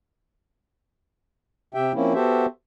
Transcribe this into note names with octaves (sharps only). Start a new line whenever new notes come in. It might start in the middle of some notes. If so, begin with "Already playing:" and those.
C3 G4 E5 G5
F3 A#3 C4 C#4 E4
B3 F#4 G4 A4 C5 E5